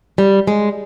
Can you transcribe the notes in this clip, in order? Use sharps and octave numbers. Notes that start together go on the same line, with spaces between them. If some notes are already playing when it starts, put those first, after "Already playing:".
G3
G#3